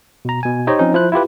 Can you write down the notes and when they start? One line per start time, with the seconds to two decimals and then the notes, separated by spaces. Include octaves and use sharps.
0.25 B2 A#5
0.43 B2 G#5
0.67 D#4 G4 C5 C#5 D#5
0.79 F3 C4 C#4 D#4
0.94 F3 E4 C5 F#6
1.12 E4 F4 G4 B4